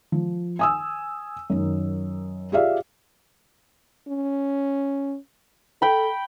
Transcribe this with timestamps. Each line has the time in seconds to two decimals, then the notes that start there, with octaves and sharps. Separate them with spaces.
0.12 F3
0.59 G#5 D#6 E6
1.50 F#2 D#3
2.52 F4 G4 G#4 D5 E5 F5
4.08 C#4
5.82 A4 G5 B5